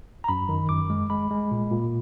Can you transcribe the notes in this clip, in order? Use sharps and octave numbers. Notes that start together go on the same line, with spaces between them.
A#5
F#2 B5
D#3
F#2 D6
G#3
G#3 B5
G#3
A#2
A#2